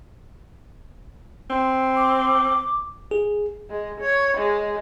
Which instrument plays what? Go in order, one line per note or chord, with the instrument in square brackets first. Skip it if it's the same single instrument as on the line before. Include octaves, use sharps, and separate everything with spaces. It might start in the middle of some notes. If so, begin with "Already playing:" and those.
[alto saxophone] C4 [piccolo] C6
[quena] D6
[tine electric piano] G#4
[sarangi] G#3
C#5
G#3